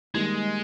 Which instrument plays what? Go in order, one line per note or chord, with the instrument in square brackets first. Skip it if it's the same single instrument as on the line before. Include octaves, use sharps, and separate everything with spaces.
[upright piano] D#3 G3 A#3 D#4 [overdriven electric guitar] G#3